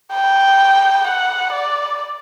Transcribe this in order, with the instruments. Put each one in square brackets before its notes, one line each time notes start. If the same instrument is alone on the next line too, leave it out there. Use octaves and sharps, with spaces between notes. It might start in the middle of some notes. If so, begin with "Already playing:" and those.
[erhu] G5
F#5
D5